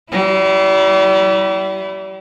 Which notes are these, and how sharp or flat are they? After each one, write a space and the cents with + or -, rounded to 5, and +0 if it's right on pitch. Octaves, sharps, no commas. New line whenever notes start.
G3 -40 E4 +0